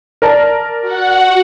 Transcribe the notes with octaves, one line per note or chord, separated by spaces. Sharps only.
A#4 D5 A5
F#4 F#5